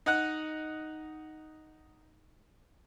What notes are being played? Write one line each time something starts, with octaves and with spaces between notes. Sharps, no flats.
D#4 F#5